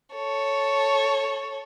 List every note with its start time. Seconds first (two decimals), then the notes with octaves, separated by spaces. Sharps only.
0.15 A4 C#5